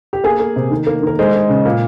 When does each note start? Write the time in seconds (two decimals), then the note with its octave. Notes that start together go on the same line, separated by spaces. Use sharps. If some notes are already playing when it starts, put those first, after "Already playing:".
0.13 G4
0.24 A#3 G#4
0.40 A#3
0.56 C3
0.71 D#3
0.87 A#3
1.02 D#3 A#4
1.19 G#3 C5
1.33 G#3
1.49 C#3
1.65 A#2